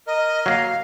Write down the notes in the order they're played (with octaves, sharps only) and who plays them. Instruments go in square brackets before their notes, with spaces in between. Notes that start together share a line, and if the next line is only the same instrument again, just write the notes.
[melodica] A#4 [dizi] D#5
[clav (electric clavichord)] F#3 A#3 [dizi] F5